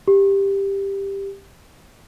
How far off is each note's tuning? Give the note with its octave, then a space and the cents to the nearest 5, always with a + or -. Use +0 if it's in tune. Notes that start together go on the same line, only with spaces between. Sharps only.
G4 +10